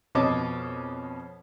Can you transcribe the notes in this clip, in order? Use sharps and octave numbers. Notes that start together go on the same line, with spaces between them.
F2 B2 C#4 D#5 A5 D6